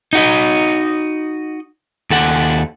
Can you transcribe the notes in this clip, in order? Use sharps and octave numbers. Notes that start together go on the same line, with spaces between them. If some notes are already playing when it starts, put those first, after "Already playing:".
D#4 F#4 D#5
D#2 A4 F#5